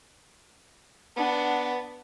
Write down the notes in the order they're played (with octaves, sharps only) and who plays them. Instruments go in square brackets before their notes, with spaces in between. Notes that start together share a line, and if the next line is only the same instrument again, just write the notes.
[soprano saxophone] B3 [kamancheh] D4 F#5